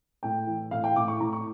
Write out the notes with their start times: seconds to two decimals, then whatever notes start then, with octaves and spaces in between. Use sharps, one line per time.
0.23 A2 G5
0.47 E3
0.71 A2 F5
0.84 G5
0.96 A2 D6
1.08 C#6
1.20 A2 A#5
1.33 C#6